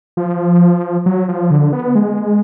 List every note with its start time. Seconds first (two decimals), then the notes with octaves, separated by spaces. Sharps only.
0.17 F3
1.06 F#3
1.28 F3
1.51 D3
1.73 B3
1.95 G#3